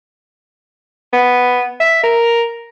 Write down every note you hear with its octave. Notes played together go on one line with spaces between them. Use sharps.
B3
E5
A#4